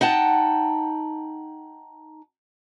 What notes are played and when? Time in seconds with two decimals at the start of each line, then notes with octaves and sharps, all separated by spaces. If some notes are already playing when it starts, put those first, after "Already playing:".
0.01 D#4 F#5 G5 A5